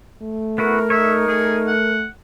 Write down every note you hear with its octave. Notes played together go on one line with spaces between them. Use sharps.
A3
B3 E4 F#4 A#4
D#4 C#5 E5
A3 G#4
F#5